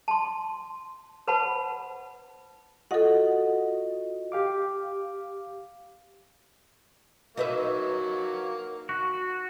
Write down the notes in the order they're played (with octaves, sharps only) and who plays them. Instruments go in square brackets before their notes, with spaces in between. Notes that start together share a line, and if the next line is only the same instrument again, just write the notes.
[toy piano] A5 C6
B4 C5 F#5 A5 B5
[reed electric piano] F4 F#4 D#5 [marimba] A4 F#5
[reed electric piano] G4 F5 D6
[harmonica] F#3 A#3 [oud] D#4 B4 E5
[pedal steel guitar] F#4